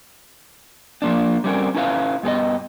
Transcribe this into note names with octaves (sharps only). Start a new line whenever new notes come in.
F3 A#3 D4
G3 C4 C#4 A#4
C#4 E4 B4 F5
G2 B3 G#4 D#5